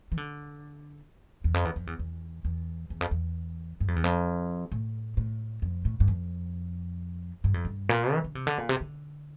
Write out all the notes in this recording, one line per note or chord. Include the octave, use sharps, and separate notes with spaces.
E3
D3
E2
F2
E2
F2
E2
E2
E2
E2
F2
E2
G2
F2
E2
F2
A2
A2
F2
A2
G2
F2
G2
F2
G2
A#2
E3
D3
C3
D3
A#2
C3
D3